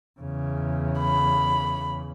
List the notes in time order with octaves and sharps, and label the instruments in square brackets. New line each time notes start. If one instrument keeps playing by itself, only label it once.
[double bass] E2 C#3
[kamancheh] B5